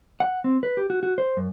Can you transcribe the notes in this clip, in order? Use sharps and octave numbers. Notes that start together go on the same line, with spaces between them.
F#5
C4
B4
G4
F#4
F#4
C5
F#2